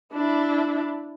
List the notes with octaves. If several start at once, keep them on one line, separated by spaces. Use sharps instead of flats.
D4 E4